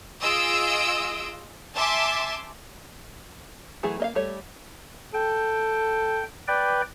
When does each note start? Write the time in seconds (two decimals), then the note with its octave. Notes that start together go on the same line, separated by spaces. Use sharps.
0.20 F4 G#4 D#5 E6 D7
1.77 E5 G#5 A5 C6 D6
3.83 E3 F#3 A3 G#4
4.00 A#3 D#5 F5
4.15 G3 A3 C#5
5.14 A4 G5
6.48 B4 D5 G5